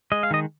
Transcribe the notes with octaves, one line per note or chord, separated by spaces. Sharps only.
G#3 D#5
F5
D#3 D#5